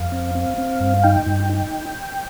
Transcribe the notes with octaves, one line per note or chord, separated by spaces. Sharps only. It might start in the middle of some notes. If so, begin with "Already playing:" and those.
Already playing: F2 F5
C4
C4
C4
G2
D#4 G5
G2
D#4